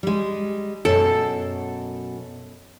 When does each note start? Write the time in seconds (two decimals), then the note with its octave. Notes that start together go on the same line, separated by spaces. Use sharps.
0.03 G3 G#3
0.85 F#2 B2 A4